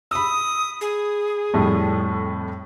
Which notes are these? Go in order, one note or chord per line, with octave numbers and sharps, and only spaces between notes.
B5 D#6 E6
G#4
F2 A2 G3